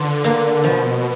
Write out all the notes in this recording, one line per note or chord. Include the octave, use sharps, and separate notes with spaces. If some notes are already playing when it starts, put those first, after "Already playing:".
Already playing: D3 F4 B4
A#3
B2 F3